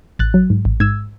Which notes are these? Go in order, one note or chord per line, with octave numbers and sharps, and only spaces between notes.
A1 F#6 A6
F#3
G#2
A1
G#2 E6 G#6